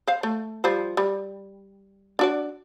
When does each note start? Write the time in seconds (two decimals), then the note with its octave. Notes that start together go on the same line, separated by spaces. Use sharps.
0.07 C5 F5
0.23 A3
0.64 F3 G3 C5
0.97 G3
2.19 D4 F#4 D5